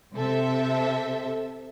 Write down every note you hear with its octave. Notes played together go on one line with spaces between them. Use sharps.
C3 A4 E5